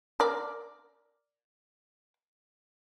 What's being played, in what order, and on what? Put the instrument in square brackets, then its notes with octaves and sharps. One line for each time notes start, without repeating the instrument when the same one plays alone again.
[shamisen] A#4 D5